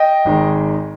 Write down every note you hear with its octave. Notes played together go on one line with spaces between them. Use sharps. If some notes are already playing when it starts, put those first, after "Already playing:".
Already playing: D#5 G5
G#1 D#3 G#3